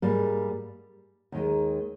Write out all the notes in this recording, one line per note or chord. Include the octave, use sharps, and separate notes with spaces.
G#2 G3 A#3
D#2 D#3 G#3